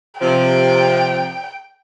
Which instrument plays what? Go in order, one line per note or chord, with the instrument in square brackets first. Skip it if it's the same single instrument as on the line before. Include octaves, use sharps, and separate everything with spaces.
[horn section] C3 F3 [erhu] G5